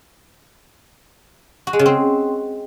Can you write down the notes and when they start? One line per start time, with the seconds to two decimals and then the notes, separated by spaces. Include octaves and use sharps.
1.67 F#4
1.73 G#3
1.79 C#3
1.86 C4